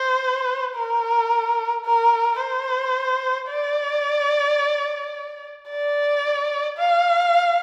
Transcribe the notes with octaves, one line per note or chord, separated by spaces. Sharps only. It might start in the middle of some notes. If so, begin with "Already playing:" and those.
Already playing: C5
A#4
A#4
C5
D5
D5
F5